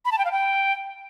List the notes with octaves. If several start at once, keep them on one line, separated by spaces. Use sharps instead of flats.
B5
A5
G5
F5
G5